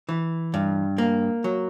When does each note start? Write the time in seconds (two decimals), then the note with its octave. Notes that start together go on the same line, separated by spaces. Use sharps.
0.09 E3
0.54 G2
0.98 A#3
1.44 F#3